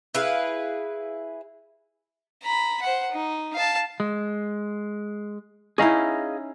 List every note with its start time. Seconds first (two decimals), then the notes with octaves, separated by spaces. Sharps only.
0.15 E4 G#4 B4 F5
2.42 A#5 B5
2.82 C5 F#5
3.12 D#4
3.55 F5 A5
4.00 G#3
5.78 C#4 D#4 E4 G#4 D#5 F5